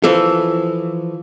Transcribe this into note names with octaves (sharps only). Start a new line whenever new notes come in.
E3 F3 A4